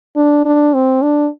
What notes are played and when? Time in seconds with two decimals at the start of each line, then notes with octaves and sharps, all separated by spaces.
0.16 D4
0.45 D4
0.74 C4
1.02 D4